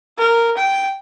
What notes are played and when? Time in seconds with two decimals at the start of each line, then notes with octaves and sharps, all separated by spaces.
0.18 A#4
0.57 G5